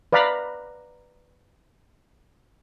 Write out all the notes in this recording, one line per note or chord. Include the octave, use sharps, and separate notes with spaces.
B4 D5 F5 A#5 B5